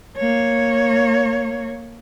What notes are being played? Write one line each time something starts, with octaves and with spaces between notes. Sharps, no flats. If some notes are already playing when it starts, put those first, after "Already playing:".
A#3 C#5